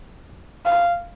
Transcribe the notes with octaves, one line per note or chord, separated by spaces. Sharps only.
F5